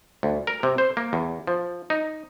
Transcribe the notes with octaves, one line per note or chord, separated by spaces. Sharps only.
D2
A#4
C3
C5
A#3
E2
F3
D#4